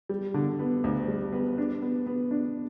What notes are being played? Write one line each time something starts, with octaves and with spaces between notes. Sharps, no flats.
G3
D3
B3
D2
G3
B3
D4
B3
B3
D4